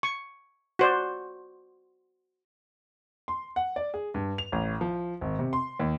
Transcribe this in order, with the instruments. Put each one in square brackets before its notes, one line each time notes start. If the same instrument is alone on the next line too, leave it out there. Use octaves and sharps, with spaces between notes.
[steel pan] C#6
F#4 C5 D5
[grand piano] C6
F#5
D5
G#4
G2
F7
A1
F3
G#1
C3
C6
D#2